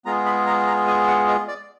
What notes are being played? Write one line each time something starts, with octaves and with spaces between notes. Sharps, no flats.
G#3 B3 F4 G#4 A#5
B5
A#5
A#5
G#5
F#5
D#5
D5